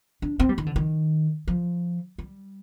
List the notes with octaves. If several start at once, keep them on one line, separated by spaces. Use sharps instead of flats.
D4
C4
G3
D#3
D3
D#3
F3
G3